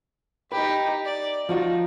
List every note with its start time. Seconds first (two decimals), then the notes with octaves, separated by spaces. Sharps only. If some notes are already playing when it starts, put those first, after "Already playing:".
0.52 D#4 G4 B4
1.05 D5
1.49 F3 D#4 F4 F#4